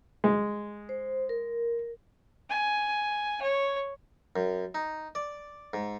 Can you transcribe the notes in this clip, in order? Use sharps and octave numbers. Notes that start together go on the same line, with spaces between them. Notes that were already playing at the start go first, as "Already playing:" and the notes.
G#3
C5
A#4
G#5
C#5
F#2
D#4
D5
G#2